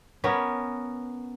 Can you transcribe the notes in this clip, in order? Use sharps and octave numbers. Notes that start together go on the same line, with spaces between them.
B3 C#4 A#4